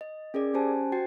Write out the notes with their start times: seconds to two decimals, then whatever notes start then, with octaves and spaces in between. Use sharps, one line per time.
0.01 D#5
0.34 C#4 G#4 A#4 D5
0.54 C#4 G4 C5 G#5 A5
0.92 F#4 C5 G5 A6 C7